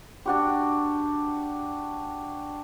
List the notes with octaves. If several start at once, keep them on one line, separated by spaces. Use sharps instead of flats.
D4 F#4 G4